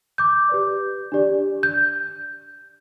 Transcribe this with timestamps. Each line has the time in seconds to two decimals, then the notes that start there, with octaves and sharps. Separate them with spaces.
0.18 D6 G6
0.49 G4 B4 D5
1.12 D4 G4 D5
1.63 G6